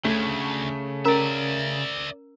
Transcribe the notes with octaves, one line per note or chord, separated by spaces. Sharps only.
D2 C#3 A3
C#4 A#4 D5 E5 A#5